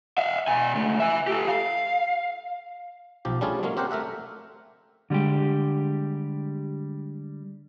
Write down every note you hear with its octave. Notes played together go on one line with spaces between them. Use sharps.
E5 F5
B2 G#5
C#2 A3
E5 G#5
G4 A4
F5
B1 F3 G4
G3 A3 C#4 D4 F4 G#4
F#3 G#3 A#3 C#4
C4 G4 A#4 C5 F#5
A3 A#4 E5 F#5
D3 G3 G#3 G4